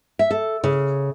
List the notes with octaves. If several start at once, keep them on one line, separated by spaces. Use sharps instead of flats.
E5
A4
C#3